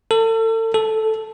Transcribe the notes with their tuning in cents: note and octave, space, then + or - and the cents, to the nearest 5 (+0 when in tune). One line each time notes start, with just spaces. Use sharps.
A4 +35
A4 -5